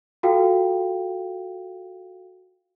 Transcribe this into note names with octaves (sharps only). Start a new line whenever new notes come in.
F4 F#4 A4 F5 G5